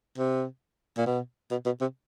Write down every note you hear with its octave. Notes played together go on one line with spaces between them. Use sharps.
C3
A#2
B2
B2
B2
C3